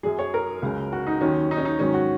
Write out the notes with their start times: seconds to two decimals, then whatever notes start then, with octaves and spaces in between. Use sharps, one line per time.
0.03 F#2 F#3 G#4
0.19 C#5
0.34 A#4
0.62 C#2 C#3 F#3
0.93 F#4
1.07 D#4
1.21 D#2 D#3 F#3 C#4
1.51 D#4
1.57 C#4
1.65 D#4
1.79 G#2 D#3 F#3 C#4
1.94 F#4